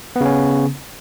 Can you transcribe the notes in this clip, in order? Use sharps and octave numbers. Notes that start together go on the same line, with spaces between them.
C#3 B3 C#4